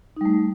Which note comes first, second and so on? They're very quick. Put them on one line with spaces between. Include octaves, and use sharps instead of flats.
D#4 G3 A3